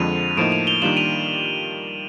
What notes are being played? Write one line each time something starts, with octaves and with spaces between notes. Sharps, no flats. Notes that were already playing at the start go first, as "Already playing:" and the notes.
Already playing: F2 D3 F3 G#3 D#7 F7
A2 F3 A#3 D#4 D7 E7
D#7 F7
F7 G7
D#3 G3 A#3 D4 F4 E7 F#7
D#7 F7